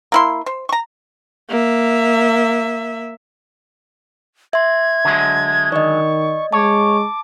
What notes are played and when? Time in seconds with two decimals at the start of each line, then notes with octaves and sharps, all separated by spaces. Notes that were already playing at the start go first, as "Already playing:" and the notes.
0.12 A#3 E4 C6
0.46 C5
0.69 A#5 C#6
1.49 A#3 E5
4.53 E5 C6 G#6
5.05 D3 F#3 G#3
5.72 D#3 D5 D#5 C#6
6.53 G#3 C#5 A5 D6